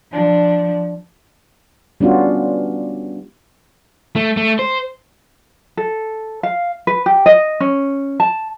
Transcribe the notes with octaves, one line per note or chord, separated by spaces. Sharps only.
F3 D4
G3 B3 C#4 D4 F4 F#4
A3
A3
C5
A4
F5
B4
G4
D#5
C#4
A5